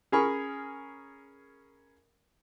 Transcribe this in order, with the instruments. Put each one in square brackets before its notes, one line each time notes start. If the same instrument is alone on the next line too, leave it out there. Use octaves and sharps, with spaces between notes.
[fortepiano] C#4 G#4 A#4 B5 C#6